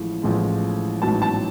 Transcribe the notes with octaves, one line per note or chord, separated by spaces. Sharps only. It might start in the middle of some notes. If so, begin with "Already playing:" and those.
Already playing: A1 A2 F3 G#3
A1 A2 F3 G#3
A1 G#2 F#3 A5
A5